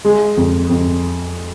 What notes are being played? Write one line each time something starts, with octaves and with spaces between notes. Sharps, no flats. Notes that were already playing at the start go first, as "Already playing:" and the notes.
G#3
F2
F2